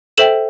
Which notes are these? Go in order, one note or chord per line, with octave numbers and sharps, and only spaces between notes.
A4 C5 E5 G5 E7 F#7